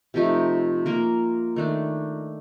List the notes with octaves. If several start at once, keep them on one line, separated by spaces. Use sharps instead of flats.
C3 F3 A3 D#4
A#3 F4 A#4
D#3 A3 D4